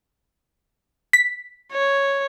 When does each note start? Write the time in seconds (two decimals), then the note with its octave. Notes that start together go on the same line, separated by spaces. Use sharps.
1.13 B6
1.72 C#5